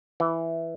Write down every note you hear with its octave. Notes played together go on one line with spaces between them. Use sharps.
E3